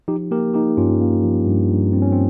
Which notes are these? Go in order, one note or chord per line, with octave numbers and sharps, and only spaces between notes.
F3 D#4 G4
A#3 G4 A#4
A#3 D#4 G4
G2 C#4 F4
A#3
F3
G2
G2
G2 C4
C#4
C4